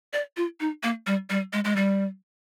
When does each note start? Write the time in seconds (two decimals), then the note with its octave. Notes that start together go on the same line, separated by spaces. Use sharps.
0.13 D5
0.37 F4
0.60 D#4
0.83 A#3
1.07 G3
1.30 G3
1.53 G#3
1.64 G#3
1.76 G3